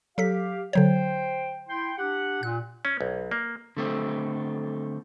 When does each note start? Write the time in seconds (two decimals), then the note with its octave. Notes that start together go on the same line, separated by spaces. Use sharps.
0.18 F#3 G4 A4 F5 B6
0.73 D3 F#3 C5 C#5 G5
1.69 E4 G5 C6
1.98 D4 G4 F#5
2.43 A#2 F#6
2.85 C#4
3.01 B1
3.31 A#3
3.77 D3 A3 C4